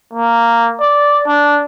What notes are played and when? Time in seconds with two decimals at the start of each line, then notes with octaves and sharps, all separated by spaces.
0.13 A#3
0.80 D5
1.27 D4